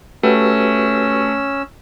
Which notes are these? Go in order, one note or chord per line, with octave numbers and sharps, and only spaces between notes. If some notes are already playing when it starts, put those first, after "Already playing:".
A3 C#4 F#4 G4 B4 E6